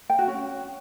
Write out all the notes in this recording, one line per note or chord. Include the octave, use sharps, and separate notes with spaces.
G5
F#4
C#4